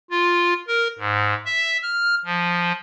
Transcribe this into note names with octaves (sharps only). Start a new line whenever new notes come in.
F4
A#4
G#2
E5
F6
F3